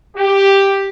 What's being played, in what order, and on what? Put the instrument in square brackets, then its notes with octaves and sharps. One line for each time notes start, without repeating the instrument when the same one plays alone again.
[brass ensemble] G4